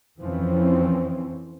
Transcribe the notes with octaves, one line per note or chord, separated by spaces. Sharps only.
F2 E3 F3 C4 C#4